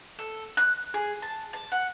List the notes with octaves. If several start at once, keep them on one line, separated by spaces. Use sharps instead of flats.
A4
F#6
G#4
A5
A5
F#5